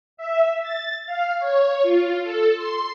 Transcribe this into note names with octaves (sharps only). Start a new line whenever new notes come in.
E5
A6
F5
C#5
F4
A4
C6